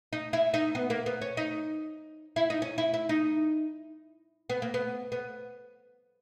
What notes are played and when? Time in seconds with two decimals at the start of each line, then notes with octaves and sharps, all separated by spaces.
0.13 D#4
0.33 E4
0.54 D#4
0.75 B3
0.90 A#3
1.06 B3
1.22 C#4
1.37 D#4
2.36 E4
2.50 D#4
2.62 C#4
2.78 E4
2.94 E4
3.09 D#4
4.50 B3
4.62 A#3
4.74 B3
5.12 B3